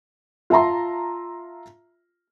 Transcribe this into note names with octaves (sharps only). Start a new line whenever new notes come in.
F4 E5 A5 A#5 C6